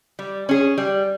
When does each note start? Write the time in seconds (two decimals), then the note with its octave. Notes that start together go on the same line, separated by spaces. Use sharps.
0.19 G3
0.49 C#4 G#4
0.78 G3